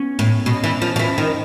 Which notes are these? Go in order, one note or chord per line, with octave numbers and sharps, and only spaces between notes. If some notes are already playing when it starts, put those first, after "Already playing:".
Already playing: B3 C#4
A2
B2
E3
F3
F3
E3
D#3